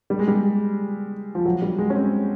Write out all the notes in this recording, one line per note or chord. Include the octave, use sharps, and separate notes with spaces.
G3
G#3
G3
F3
F#3
G3
G#3
C#4
C4